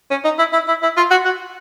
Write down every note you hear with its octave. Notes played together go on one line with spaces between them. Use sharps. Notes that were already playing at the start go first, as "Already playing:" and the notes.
C#4
D#4
E4
E4
E4
E4
F4
F#4
F#4